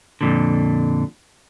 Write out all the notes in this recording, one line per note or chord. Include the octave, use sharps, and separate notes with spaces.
F2 A#2 D3